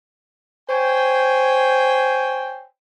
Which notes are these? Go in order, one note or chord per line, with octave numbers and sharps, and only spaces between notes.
C5 C#5 G5 G#5